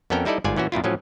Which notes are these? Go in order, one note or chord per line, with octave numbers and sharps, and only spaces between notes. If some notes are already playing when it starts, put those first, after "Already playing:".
F2 B3 C#4 A4 A#4 G5
G3 D#4 E4 A4 D5 D#5
G1 G#2 F4 D5 G#5
A#2 E3 C#4 F#4
F#2 A#2 E4 F4
A2 F3 F#3 C#4